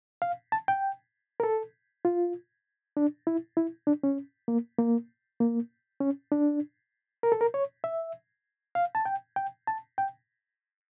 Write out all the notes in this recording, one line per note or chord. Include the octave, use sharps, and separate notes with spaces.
F5
A5
G5
A#4
A4
F4
D4
E4
E4
D4
C#4
A#3
A#3
A#3
C#4
D4
A#4
A4
A#4
C#5
E5
F5
A5
G5
G5
A5
G5